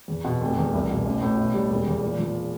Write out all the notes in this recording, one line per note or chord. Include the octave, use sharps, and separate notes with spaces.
E2
B2
F1
E2
C2
B2
A1
A2
B2
G3
E1
E2
A#2
F3